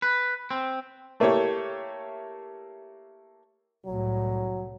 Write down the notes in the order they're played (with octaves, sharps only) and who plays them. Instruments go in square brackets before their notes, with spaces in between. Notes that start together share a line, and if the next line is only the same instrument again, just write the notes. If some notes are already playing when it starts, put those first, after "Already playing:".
[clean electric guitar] B4
C4
[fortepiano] A3 A#3 E4 G4 C#5
[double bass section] C2 A2 [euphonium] F#3